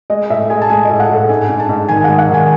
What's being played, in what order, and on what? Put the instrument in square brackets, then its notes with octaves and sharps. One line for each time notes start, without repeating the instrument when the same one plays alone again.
[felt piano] G#3 D#5
A2 E5
G#3 G#5
A5
G#3 G#5
A2 D#5
F#5
A2 A4
G#2 G#5
G#2
A5
G#2
D#3 G#5
G#3 F#5
F#5
D#3 G#5